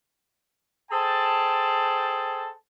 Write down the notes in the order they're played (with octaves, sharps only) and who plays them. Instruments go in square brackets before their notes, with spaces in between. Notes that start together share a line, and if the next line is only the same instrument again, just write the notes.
[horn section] G#4 A4 C5 G5 A5